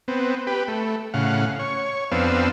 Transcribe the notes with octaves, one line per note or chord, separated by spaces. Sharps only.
B3 C4
G4 B4
A3
A2 C#3 F5 F#5
C#5
F2 B3 C4 D4 F5 E6